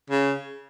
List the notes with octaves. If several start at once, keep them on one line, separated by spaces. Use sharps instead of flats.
C#3